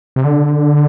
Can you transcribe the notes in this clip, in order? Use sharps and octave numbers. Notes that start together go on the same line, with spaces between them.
C3
D3